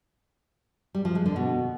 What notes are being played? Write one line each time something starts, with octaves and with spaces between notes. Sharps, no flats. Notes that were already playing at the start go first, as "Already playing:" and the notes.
G3
F3
G#3
D3
B2